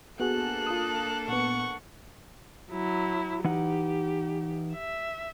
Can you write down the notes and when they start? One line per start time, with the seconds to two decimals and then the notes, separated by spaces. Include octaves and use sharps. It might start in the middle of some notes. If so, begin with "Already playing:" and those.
0.20 A#3 B3 D4 F#4 G#4 A4 F#6
0.67 F4 A5 D#6
1.28 A#2 B3 F#5 C#6
2.70 F#3 E4
3.44 E3 D#4 G4 F#5
4.73 E5